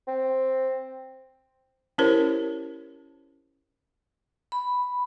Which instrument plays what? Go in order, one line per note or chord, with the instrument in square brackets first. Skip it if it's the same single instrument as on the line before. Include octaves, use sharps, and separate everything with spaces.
[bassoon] C4
[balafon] C#4 E4 G4 A#4 C5 C#5
[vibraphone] B5